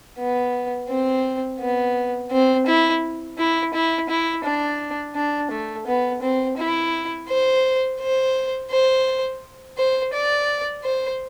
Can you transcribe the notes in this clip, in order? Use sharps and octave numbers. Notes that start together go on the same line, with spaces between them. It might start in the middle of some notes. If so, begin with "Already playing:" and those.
B3
C4
B3
C4
E4
E4
E4
E4
D4
D4
A3
B3
C4
E4
C5
C5
C5
C5
D5
C5